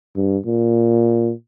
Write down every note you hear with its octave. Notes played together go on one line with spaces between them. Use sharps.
G2
A#2